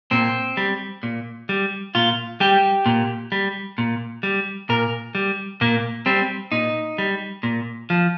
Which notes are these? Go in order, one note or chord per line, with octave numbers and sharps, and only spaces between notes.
A#2 C4
G3
A#2
G3
A#2 F4
G3 G4
A#2
G3
A#2
G3
A#2 A#4
G3
A#2 A#3
G3 C4
A#2 D#4
G3
A#2
F3